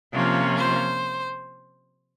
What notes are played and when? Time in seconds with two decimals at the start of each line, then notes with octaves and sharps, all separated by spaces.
0.13 C3 F3 A#3 C#4 F4
0.56 C5